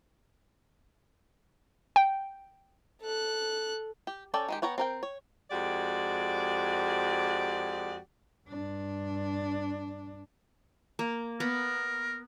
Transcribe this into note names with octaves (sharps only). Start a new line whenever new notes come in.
G5
A4 F#6
G4
C#4 A4 D5 G5
D#3 G#3 G4
B3 C#5 G5 A#5
C4 A#4 G5
C#5
F2 G#3 F#4 G4 D5
G2 D4
A#3
B3 A#4